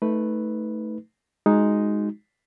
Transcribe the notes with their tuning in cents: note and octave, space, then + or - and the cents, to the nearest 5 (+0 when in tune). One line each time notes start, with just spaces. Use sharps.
A3 +0 D#4 +20 B4 +0
G#3 +0 D#4 +0 F#4 +0